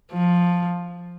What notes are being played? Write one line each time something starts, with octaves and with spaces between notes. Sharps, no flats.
F3